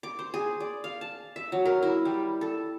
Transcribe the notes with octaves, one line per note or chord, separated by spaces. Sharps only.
D6
C5
G#4
D5
F5
A5
E5
F#3
A#4
E4
G3
A4